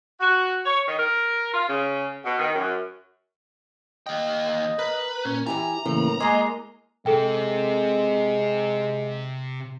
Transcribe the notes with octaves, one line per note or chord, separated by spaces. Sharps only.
F#4
C#5
D#3
A#4
F4
C#3
B2
D#3
F#2
D#2 D#5 G5
A#4 B4
A#2 C#4
E3 E4 G4 G#5 A#5
A2 C#3 E3 A#3
G#3 A#3 D#5 G#5 C6
C3 G#3 G#4 A4 G5